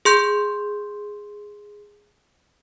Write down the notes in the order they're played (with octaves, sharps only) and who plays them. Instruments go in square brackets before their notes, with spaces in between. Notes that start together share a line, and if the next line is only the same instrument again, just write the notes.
[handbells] G#4 C6 G6